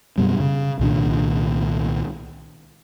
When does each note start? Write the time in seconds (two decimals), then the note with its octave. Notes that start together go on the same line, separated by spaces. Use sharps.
0.18 F#2 B2 G3
0.40 C#3
0.79 C2 A#2 D#3 D4